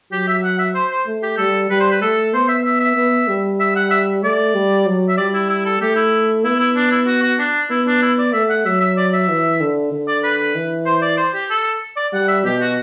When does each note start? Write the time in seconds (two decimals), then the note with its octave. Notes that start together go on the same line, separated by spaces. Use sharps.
0.12 F#3 G4
0.28 E5
0.44 F#5
0.59 E5
0.75 C5
0.92 C5
1.07 A3
1.23 G4
1.38 G3 A4
1.70 G3 B4
1.80 C5
1.91 B4
2.01 A3 A4
2.34 B3 C5
2.49 E5
2.65 E5
2.80 E5
2.96 B3
3.28 G3
3.60 E5
3.76 F#5
3.91 E5
4.23 A3 D5
4.54 G3
4.86 F#3
5.09 E5
5.17 G3 D5
5.34 E4
5.50 E4
5.66 A4
5.81 A3 G4
5.96 E4
6.44 B3 E4
6.60 E4
6.76 D4
6.91 E4
7.07 F#4
7.23 F#4
7.39 D4
7.70 B3 E4
7.87 D4
8.02 E4
8.18 D5
8.33 A3 E5
8.50 F#5
8.65 F#3 E5
8.81 E5
8.97 D5
9.13 E5
9.29 E3
9.60 D3
9.92 D3
10.08 D5
10.24 B4
10.55 E3
10.86 C5
11.02 D5
11.18 C5
11.34 G4
11.50 A4
11.97 D5
12.13 G3 F#5
12.28 E5
12.45 B2 G4
12.61 F#4